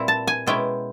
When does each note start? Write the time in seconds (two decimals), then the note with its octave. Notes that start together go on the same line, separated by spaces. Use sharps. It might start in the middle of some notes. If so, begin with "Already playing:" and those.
Already playing: A#2 G3 C4 E4
0.08 A5
0.27 G#5
0.47 B2 G#3 C#4 E4 G5